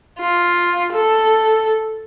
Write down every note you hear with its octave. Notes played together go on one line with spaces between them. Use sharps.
F4
A4